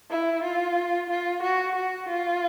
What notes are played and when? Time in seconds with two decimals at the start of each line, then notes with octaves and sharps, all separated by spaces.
0.10 E4
0.43 F4
1.10 F4
1.42 F#4
1.75 F#4
2.08 F4